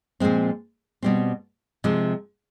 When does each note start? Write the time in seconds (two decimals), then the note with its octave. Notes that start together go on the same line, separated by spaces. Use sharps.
0.20 A#2 F3 G#3 C4
1.03 B2 G3 C4
1.84 C3 F3 G#3